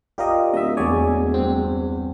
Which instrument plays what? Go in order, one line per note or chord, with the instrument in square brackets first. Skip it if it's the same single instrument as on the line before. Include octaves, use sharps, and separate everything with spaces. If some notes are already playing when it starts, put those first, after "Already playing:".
[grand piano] F4 D5 F5 [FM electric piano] G4 A#4 D#5
[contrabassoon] D1 [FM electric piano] D#5 E5
[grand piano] E2 G#3 D#6 [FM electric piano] C#5 D5 G#5
[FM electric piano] G2 C4